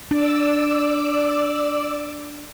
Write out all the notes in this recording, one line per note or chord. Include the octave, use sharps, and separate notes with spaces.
D4 D5 D6 E6